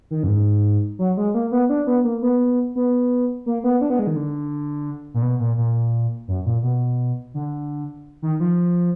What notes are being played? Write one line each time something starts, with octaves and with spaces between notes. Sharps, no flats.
D#3
F#2
G#2
F#3
G#3
A#3
B3
D4
B3
A#3
B3
B3
A#3
B3
D4
B3
G#3
D#3
D3
A#2
B2
A#2
A#2
F#2
A#2
B2
D3
D#3
F3